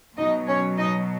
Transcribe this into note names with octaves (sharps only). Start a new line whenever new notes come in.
B2 F#3 D#4 D#5
C#4 C#5
D#4 D#5